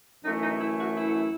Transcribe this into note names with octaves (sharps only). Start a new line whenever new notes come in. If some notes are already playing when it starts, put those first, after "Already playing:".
F#2 E3 A3 D#4
D#4
E4
F#4
E4